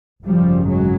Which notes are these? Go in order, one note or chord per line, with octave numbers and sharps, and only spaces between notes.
G#1 F#2 C#3 F3 G3
F#3 G#3